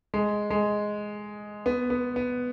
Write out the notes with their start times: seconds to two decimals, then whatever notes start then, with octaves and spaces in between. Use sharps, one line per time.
0.14 G#3
0.50 G#3
1.66 B3
1.90 B3
2.16 B3